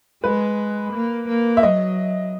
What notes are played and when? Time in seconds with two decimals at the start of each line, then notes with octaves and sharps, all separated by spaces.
0.24 G#3 B4
0.93 A#3
1.28 A#3
1.57 E5
1.63 F#3 D#5